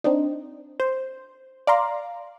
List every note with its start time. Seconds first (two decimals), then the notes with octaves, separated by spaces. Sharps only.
0.04 C4 D4 D#4
0.80 C5
1.67 D5 F5 A#5 C6